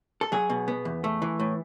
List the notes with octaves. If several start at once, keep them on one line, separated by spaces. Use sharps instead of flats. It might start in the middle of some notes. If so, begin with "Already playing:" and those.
A4
F#3 G#4
B2
B3
E2
A3
E3
A2